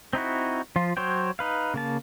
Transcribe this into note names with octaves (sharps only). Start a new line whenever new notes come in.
C4 D#4 E4 F#4
F3 F4
F#3 C5 C#5 G5
D#4 B4 F5
C#3 A#3 A5